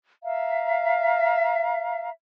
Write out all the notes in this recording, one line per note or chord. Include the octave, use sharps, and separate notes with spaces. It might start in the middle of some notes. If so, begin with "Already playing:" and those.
E5 F5 A#5